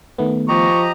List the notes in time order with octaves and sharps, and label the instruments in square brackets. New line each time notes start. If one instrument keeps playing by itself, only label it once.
[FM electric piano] D#3 A3 B3
[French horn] F3 [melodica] G4 D#5 A#5 [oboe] C#6